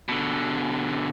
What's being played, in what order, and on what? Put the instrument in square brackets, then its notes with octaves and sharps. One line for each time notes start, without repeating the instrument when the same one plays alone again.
[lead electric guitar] B2 D3